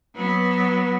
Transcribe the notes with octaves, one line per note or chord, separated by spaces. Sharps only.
F#3 B3